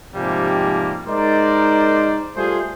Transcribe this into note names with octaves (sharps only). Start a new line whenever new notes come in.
G#2 C3 F3 G3 G#3 A#3
G#3 D#4 A#4 C5 D5
G3 A3 F4 G#4 C5